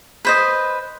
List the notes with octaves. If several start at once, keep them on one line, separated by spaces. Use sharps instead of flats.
B4 C5 D#5